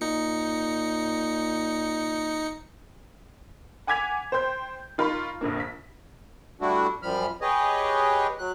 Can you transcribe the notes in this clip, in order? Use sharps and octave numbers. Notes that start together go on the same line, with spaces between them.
A#2 D#4 C#7
F#5 G#5 D6 G#6 B6 F7
C5 G5 C6 G6
D#4 F4 A#4 B5 C#6
A#1 F2 D3 A#3
B6
G3 A3 D4 E4 F#4
F#2 F3 G3 B5 F6
G4 G#4 B4 C#5 D#5
F#3 F#6